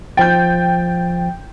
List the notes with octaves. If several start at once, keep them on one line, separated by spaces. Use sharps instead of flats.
F3 G5 G6 A6